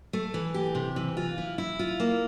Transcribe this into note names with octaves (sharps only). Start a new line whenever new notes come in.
A3
E3
G4
C3
E3
F4
E4
E4
F4
A#3